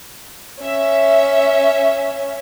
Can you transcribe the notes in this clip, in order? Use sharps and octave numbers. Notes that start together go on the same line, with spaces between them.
C#4 E5